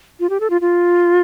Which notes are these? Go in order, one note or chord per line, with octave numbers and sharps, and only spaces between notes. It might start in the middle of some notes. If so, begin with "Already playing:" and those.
F4
G4
A4
F4
F4